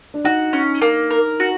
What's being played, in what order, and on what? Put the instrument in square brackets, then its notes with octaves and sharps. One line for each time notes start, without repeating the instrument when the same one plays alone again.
[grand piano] D4
[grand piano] D#4 [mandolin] F#4
[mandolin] C#4
A#3
A#4
F#4